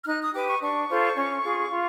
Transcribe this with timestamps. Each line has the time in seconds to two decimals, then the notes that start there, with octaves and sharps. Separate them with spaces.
0.03 F6
0.07 D#4 F#6
0.20 D#6
0.33 G4 B4 D6
0.48 C#6
0.61 D4 C#6
0.89 F4 A4 C5
1.16 C#4
1.43 F4 G#4
1.70 F4